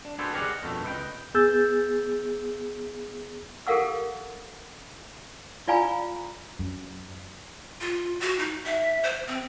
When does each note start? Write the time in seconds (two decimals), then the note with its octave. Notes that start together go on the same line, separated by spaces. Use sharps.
0.05 D4
0.19 D4 F#4 G#4 A4 B4 C5
0.33 G4 G#4 A#4 D5 D#5 F#5
0.63 F2 B2 D3 D#3 A3
0.83 C#2 B4 D#5 F#5 G5
1.34 B3 G#4 E6 G6 A6
3.67 G4 A4 A#4 F5 F#5 E6
5.67 F4 D5 F5 G#5 A#5 B5
6.59 F#2
7.81 F4
8.20 F#4
8.39 D#4
8.66 E5
9.03 C5
9.27 C4